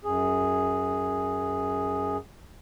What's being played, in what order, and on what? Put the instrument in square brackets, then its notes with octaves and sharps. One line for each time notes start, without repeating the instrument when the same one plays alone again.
[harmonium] F#2 G#4